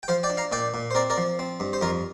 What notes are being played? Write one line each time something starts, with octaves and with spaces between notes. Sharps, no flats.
G5
F3 C5 F5
D5 G5
D4
F5 A#5
A#2 D5 G5
A#2
C5
C4 A#4 D5
A#4 D5
F3
C4
G2
C5
F2 F4 A#4